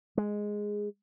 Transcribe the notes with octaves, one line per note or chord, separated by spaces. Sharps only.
G#3